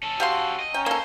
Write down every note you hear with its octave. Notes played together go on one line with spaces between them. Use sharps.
C#4 A4 A5
F#4 G4 F5 C6
D#5
C#4 G5 A#5
A#3 A4 C5